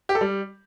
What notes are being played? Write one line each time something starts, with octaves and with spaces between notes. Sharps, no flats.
G4
A4
G3